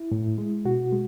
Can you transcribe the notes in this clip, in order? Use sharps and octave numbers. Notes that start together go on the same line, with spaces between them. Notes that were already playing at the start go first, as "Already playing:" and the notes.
Already playing: E4
A2
G#3
B2 F#4
G#3